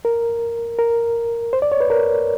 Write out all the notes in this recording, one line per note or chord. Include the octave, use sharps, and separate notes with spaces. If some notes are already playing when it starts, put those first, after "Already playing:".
A#4
A#4
C5
D5
C#5
B4
A#4